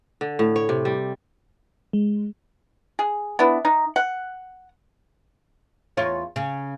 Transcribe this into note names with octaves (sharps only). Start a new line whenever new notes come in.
D3
A2
C#5
C3
G3
G#3
G#4
B3 D4 E4
D#4
F#5
E2 F4 C#5
C#3